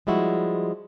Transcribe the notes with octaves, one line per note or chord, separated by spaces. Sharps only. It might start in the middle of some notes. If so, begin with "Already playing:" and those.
F3 G3 G#3 E4 F#4